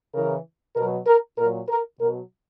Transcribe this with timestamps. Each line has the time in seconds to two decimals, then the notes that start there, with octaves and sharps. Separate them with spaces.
0.15 C#3 E3 A#4
0.76 B2 F#3 A#4
1.07 A#4
1.38 A#2 F#3 A#4
1.69 A#4
2.00 B2 F#3 A#4